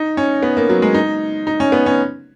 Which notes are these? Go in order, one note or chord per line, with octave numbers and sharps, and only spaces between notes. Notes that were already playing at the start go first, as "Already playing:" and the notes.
Already playing: D#4
C#4
B3
A#3
F#3
G#3
D#4
D#4
C#4
B3
C#4